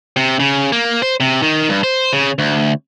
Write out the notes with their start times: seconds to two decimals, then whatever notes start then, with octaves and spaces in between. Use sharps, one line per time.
0.16 C3
0.40 C#3
0.72 A#3
1.02 C5
1.20 C3
1.42 D#3
1.69 G2
1.84 C5
2.13 C#3
2.39 D2